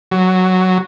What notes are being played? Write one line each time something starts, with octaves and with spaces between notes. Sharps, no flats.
F#3